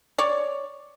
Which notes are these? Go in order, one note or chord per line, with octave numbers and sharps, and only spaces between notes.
C#5 D5